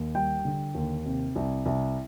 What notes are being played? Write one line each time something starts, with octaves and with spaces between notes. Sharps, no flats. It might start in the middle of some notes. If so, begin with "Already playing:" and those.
Already playing: D#2
G3 G5
D3
D#2
C3
C2
C2